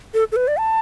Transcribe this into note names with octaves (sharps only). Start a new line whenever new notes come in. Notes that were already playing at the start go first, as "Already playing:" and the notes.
A4
A4
B4
D5
A5